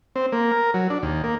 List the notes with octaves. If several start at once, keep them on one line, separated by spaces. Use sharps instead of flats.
C4
A#3
A#4
F#3
D4
D#2
A#3